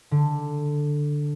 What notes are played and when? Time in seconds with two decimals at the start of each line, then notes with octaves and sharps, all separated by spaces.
0.11 D3